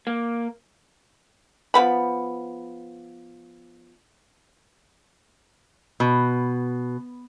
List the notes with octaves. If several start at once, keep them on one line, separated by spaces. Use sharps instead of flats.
A#3
F3 B3 B5
B2